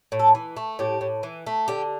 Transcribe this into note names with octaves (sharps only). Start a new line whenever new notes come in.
A2
A4
E3
A3
A2 G4
A2
E3
A3
D3 G4